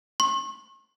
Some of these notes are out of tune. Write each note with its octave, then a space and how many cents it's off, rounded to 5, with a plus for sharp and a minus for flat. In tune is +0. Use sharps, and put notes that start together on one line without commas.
C#6 -40